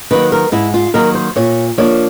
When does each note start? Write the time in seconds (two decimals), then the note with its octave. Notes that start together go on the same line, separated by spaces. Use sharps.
0.11 D#3 F#3 A#3 B4
0.32 A#4
0.52 G#2 E4
0.74 F4
0.94 D#3 F#3 A#3 A#4
1.15 C5
1.36 A#2 C#5
1.78 F3 A#3 D4 C#5